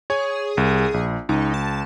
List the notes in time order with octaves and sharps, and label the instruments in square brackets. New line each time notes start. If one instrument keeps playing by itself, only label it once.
[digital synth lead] G#4 [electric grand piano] C#5
[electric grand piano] C2
A#1
[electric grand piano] C#2 [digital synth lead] D#4
[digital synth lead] A5